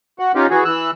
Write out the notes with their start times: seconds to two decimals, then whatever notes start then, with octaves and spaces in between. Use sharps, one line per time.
0.19 F#4 F#5
0.35 C#4 D#4 F4 G4
0.50 E3 F#4 G#4
0.65 E3 E6 F#6